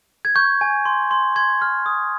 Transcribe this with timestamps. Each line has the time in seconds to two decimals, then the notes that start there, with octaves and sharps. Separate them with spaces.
0.25 G#6
0.36 C#6 G6
0.61 G#5
0.85 C6
1.11 C6
1.36 C6 G#6
1.62 F6
1.86 D#6